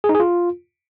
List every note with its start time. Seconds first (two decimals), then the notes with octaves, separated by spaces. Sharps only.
0.04 G#4
0.09 D#4
0.15 G#4
0.20 F4